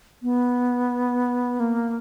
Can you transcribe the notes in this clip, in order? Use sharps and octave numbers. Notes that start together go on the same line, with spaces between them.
B3
A#3